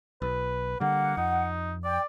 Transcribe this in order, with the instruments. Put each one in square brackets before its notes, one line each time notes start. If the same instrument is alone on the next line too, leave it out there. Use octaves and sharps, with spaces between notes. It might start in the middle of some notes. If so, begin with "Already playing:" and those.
[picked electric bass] B1 [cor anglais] B4
[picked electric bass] D3 G3 [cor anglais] A#3 [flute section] F#5
[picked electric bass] F2 [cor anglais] D#4
[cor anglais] D5 [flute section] G5